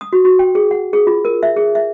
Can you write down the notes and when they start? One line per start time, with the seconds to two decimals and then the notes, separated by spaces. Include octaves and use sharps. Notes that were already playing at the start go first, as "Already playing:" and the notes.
0.01 D#6
0.13 F#4
0.25 F#4
0.39 G5
0.55 G#4
0.71 F#5
0.93 G#4
1.07 F4
1.25 A#4
1.43 E5
1.57 G#4
1.75 E5